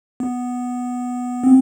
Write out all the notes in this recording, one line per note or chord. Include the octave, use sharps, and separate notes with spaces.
B3
C4